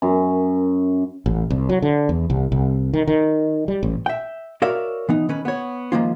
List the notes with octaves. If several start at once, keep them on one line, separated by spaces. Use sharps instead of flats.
F#2
A1
C2
F#3
D3
E2
C2
C2
D#3
D#3
G3
A1
E5 G5
F#4 A#4 C#5 D5 E5 F5
E3 B3 D#4
D#3 C#4 B4
B3 C#5
D#3 F3 G#3 A#3 C#4 F4